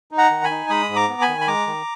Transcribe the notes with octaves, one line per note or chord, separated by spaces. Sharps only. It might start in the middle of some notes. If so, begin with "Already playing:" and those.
D#4
F#5 A#5
D#3
G#5 B5
D#4
G#3 B5 D#6
G#2
A#5 D6
B3
G#5 B5
D#3
B5
G#3 A#5 D6
D#3